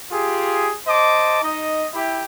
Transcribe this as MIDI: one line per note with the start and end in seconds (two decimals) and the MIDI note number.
0.12 0.73 65
0.12 0.73 67
0.12 0.73 68
0.87 1.40 72
0.87 1.40 75
0.87 1.40 81
0.87 1.40 86
1.42 1.88 63
1.42 1.88 75
1.94 2.24 64
1.94 2.24 67